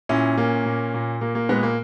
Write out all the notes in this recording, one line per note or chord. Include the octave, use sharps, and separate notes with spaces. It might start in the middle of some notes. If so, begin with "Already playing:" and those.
A#2 C#4 E4
A#2 A#3 C#4
A#2
A#2
A#2 A#3
A#3
A#2 G#3 B3
A#3